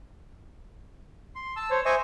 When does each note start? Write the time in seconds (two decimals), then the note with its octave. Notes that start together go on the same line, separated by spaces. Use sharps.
1.35 C6
1.56 A5 E6
1.71 C5 C#5
1.85 C5 D#5 E5 G#5 C#6